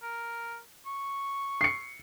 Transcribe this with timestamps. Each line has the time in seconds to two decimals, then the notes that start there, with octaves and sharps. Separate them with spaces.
0.03 A#4
0.86 C#6
1.61 C7 C#7